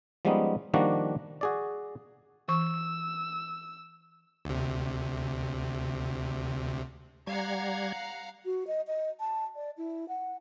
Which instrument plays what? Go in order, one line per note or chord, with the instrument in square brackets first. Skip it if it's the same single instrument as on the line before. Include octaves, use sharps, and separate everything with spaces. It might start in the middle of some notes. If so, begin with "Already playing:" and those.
[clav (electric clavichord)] F3 G3 G#3 B3 C#4 D#4
D#3 F3 G3 A#3 D4 F#4
F#4 G#4 D5
[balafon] E3 C#6 [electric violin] E6
[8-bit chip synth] D2 C3
[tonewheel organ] G3 G#6 [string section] F5 F#5 A#5
[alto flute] F#4
D#5
D#5
A5
D5
E4
F#5